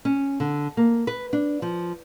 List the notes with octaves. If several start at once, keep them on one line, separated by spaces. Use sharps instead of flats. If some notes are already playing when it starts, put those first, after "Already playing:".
C#4
D3
A#3
B4
D4
F3